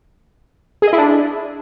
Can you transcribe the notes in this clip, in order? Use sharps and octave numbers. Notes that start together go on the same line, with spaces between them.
G#4
D#5
E4
D4